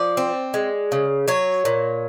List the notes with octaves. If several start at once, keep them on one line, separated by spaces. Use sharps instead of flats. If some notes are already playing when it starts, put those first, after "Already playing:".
Already playing: F3 D5
C4
G#3
C#3
F#3 C#5
A#2